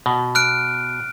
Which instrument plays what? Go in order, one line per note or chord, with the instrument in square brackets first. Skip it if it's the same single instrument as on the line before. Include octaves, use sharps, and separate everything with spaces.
[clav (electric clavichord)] B2
[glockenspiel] F6 F#6 D7